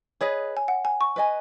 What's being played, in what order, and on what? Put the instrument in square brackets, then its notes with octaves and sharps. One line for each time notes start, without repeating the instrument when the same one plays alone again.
[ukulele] G#4 B4 D#5 [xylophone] C#5
[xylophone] G#5
F#5
G#5
C#6
[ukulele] B4 D#5 G#5